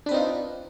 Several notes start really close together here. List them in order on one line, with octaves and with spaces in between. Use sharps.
D4 B4 C4 D#4 F4